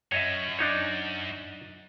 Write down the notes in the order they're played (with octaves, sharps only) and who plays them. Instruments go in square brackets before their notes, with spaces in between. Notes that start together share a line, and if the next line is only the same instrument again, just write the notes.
[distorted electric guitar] F#2 [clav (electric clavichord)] C#5 D#5 E5
[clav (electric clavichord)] D4 D#4 C#5